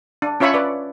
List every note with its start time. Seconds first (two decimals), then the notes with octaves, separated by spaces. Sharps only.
0.22 D4
0.40 C#4 F4 C#5 E5 B5 C#6
0.54 B4 D5